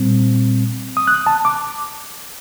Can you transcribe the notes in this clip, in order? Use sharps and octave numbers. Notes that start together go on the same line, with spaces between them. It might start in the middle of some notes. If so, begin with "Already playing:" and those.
Already playing: A#2 G3 C4
D#6
F#6
A5
D6